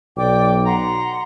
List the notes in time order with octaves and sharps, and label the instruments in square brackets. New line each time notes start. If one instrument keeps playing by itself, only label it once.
[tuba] B1 [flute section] D5 G5 D6
[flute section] F#5 C6 [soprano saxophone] A#5